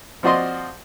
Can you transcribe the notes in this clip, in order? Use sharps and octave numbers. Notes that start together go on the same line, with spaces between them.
F3 C4 F#4 D5 D#5 C6